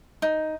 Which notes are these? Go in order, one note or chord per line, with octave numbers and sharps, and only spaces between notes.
D#4